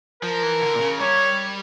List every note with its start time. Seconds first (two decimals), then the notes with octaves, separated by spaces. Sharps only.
0.23 F3 A#4
0.43 E3
0.62 D3
0.76 A#2
0.81 C#3
1.00 G3 C#5